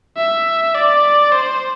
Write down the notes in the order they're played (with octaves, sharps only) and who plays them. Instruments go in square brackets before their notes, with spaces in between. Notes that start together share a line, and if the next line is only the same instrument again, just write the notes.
[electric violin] E5
D5
C5